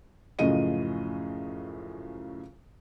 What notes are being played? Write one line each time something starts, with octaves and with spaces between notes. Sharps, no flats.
F#2 A2 C#3 F3 D#5 D#7